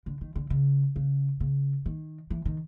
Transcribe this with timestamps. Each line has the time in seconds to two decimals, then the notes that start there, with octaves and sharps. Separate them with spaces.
0.06 D3
0.21 D#3
0.36 D3
0.50 C#3
0.96 C#3
1.40 C#3
1.86 D#3
2.30 E3
2.45 D#3